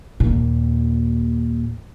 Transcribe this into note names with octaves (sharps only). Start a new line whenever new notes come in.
D#2 A#2